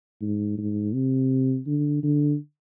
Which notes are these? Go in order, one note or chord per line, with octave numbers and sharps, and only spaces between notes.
G#2
G#2
C3
D3
D3